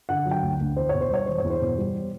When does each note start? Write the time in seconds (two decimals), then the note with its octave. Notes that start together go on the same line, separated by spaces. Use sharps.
0.09 D3 F#5
0.26 F#3
0.31 G5
0.42 D2
0.61 D2
0.77 E2 C5
0.89 B2 C#5
1.01 C5
1.11 G3 C#5
1.26 E1 C5
1.38 C#5
1.44 E2
1.50 C5
1.62 B2
1.78 G3